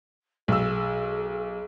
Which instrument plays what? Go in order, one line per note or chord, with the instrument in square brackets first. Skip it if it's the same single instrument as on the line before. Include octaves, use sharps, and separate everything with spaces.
[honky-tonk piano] B1 E6 [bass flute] G#4